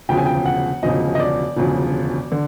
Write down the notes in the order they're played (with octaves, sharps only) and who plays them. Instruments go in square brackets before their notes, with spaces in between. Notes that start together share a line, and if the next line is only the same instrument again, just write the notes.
[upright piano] E1 D2 C#3 F3 G5
G#5
G5
F#5
E1 D2 C#3 F3 D#5
D#5
D5
E1 D2 C#3 F3
D3